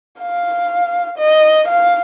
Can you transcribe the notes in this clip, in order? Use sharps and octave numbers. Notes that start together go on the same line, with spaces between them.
F5
D#5
F5